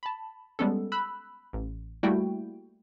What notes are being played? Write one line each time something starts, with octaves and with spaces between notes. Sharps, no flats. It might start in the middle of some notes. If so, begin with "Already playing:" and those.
A5 B5
G3 G#3 B3 C#4 A4
B5 E6 F#6
A1
G3 A3 A#3 E4 F#4 G5